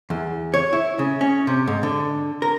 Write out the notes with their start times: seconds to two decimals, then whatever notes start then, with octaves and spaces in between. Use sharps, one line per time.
0.10 E2
0.54 C#5
0.73 E4
0.99 C#3
1.21 C#4
1.47 C3
1.67 G#2
1.83 D3
2.42 A#4